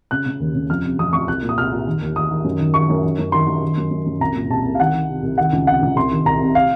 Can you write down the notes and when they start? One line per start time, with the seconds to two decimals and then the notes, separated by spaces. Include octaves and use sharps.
0.11 C#3 F#6
0.26 C#3
0.40 D#2
0.54 C#3
0.70 F2 F6
0.83 C3
0.98 F2 D#6
1.13 F2 C#6
1.28 C2 F#6
1.42 A#2
1.49 D#6
1.58 C2 F6
1.71 A#2
1.87 D#3
2.02 D#2
2.16 D#2 D#6
2.31 D#3
2.44 F#2
2.60 D#3
2.74 D#3 C#6
2.90 F#2
3.03 D#3
3.19 F#2
3.32 D#3 C6
3.48 F#2
3.62 D#3
3.77 F#2
3.91 F#2
4.06 F#2
4.20 C2 A#5
4.35 A#2
4.50 C2 A5
4.65 C2
4.75 F5
4.80 D#3 F#5
4.94 D#3
5.09 C3
5.23 C2
5.38 D#3 F#5
5.53 C#2
5.67 C3 F#5
5.82 C#2
5.96 C2 C6
6.11 D#3
6.25 C2 A#5
6.40 C3
6.55 F5